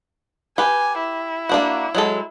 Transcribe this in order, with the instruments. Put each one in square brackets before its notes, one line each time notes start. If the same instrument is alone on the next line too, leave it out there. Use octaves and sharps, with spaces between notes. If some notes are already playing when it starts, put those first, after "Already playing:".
[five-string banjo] G4 B4 [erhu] G#5
[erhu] E4
[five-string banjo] A#3 D4 F#4
F#3 G#3 A4